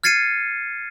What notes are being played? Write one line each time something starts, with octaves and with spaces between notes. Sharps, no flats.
F6 G#6 A6 C7 C#7 D#7